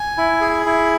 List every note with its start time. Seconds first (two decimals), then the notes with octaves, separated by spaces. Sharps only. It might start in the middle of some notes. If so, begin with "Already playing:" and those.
Already playing: G#5
0.18 E4
0.41 G#4
0.66 E4